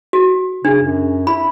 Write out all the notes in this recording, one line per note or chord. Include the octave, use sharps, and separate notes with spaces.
F#4
C#3 D4
F#2
E4 B5